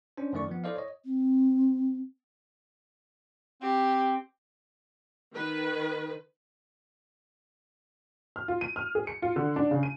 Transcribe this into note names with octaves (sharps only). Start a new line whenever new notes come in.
C#4 D4 C5
F#2 D#3 A3 D5 C#6
F3 B3
E4 A4 C5 D5 D#5 F5
C#5 D#5
C4
C4 G4
D#3 B4
F6
F4
D#7
F6
G#4
C#7
F4
D3
D4
C#3
D#7